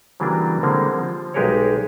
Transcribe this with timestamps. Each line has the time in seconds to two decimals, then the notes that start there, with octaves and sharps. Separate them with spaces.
0.20 C#3 E3 F#3 G3 A#3 D4
0.63 D3 G3 G#3 A#3 C4
0.99 F3
1.34 B1 G#3 G4 G#4 A#4 C#5